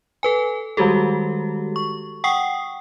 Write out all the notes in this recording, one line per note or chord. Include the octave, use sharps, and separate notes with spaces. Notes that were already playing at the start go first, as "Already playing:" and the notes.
A4 B4 G#5
D#3 G3 G#3 F#4 G4 A4
C#6
F#5 G5 C#6 D#6 C7